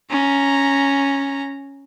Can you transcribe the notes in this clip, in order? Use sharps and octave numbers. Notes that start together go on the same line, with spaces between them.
C#4 A#5